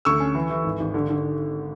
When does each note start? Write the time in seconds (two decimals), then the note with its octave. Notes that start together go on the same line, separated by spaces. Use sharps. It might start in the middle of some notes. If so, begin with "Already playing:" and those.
0.05 D2 C#6 E6
0.20 C#4
0.35 E3
0.50 E3
0.64 G#1
0.80 G#1
0.94 D3
1.09 D3